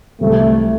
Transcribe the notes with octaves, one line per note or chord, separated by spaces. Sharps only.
C2 C3 E3 A3 C4